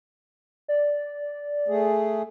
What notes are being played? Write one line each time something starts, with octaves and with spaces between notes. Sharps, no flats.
D5
A3 G#4